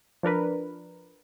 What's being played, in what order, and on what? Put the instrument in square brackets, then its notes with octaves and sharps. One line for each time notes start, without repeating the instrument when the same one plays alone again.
[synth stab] F3 D4 A#4 B4